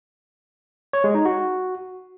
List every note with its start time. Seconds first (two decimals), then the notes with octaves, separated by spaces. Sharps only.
0.93 C#5
1.04 G#3
1.15 D#4
1.25 F#4